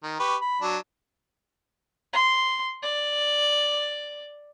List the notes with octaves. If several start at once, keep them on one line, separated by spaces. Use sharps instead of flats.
D#3
G4 B4 C#6
B5
F#3 D4
C6
D5